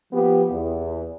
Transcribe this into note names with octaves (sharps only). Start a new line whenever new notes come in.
F3 B3 G4
E2